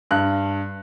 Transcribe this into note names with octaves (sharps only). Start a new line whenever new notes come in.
G2 F#6